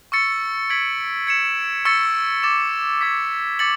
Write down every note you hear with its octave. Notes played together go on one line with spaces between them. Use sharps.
C#6 E6 A6 C#7
G#6 B6 D7 F#7
G#6 C#7 E7
C#6 E6 A6 C#7
D6 A6 E7
D6 G#6 B6
D6 A6 C#7 F#7